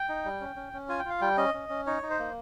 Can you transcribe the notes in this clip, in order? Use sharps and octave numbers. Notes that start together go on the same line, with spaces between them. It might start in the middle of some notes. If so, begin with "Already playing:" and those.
Already playing: G5
D#4
G3
C#4
C#4
C#4
F4 G#5
G5
F4 F5
G3 G5
C#4 D#5
C#4
C#4
D#4 C#5
D#4
C5
A#3